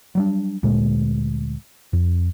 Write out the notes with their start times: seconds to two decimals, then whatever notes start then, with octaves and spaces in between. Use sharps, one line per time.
0.15 F#3 G3 D4
0.63 D2 A#2 G#3
1.93 F2